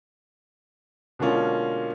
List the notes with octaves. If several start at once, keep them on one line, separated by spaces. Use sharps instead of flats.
B2 D3 G#3 A#3 C#4 F4